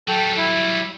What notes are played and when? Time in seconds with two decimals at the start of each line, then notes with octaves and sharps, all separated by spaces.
0.08 F#3 G3 A4 G5
0.37 E4